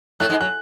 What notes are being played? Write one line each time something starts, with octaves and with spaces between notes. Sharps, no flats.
A2 A3 F#6
G#2 G#3
F#3 F#6